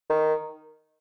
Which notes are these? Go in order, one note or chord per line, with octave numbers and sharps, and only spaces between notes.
D#3